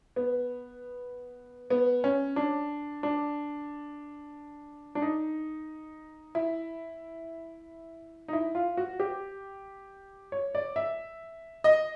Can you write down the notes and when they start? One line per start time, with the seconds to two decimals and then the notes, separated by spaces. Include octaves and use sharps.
0.16 B3
1.70 B3
2.04 C#4
2.36 D4
3.03 D4
4.95 D4
5.02 D#4
6.35 E4
8.28 D#4
8.33 E4
8.55 F4
8.77 F#4
9.00 G4
10.32 C#5
10.55 D5
10.76 E5
11.64 D#5